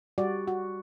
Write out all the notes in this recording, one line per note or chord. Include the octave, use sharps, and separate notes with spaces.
G3 F#4 D5
F#4